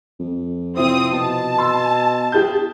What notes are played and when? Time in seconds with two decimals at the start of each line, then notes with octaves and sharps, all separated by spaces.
0.20 F2
0.76 C3 F3 C4 E4 D#6
1.13 B2 A5
1.58 C6 E6
2.32 G4 G#4 G6